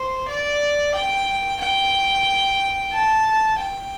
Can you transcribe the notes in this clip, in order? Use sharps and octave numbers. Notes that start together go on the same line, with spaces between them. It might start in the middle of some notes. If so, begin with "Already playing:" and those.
Already playing: C5
D5
G5
G5
A5
G5